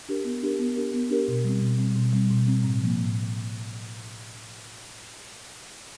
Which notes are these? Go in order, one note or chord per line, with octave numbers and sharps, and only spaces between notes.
D4 G4 A#4
B3
D4 G4 A#4
B3
D4 G4 A#4
B3
D4 G4 A#4
B2
G3 C4
B2
G3 C4
B2
G3 C4
B2
G3 C4
A2
F3 A#3
A2